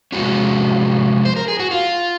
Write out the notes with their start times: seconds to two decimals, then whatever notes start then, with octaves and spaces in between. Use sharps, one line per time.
0.12 C3 F3 G#3 C#4 F#4
1.25 C5
1.36 A#4
1.48 G#4
1.60 F#4
1.71 F4